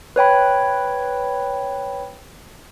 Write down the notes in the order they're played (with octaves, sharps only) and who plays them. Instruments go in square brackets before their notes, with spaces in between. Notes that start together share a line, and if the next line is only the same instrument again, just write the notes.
[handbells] B4 C#5 G5 B5